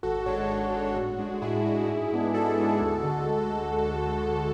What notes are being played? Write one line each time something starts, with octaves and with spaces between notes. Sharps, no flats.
G#1 F#4 A4
G#2 G#3 D4 A4 C#5
G#1 F#4
G#2 G#3 D4
A2
G#3 D4
A2 E4 G#4
G#3 D4
G#2
G#3 B3 D4
G#2 F#4 A4
G#3 B3 D4
D2
D3 G#3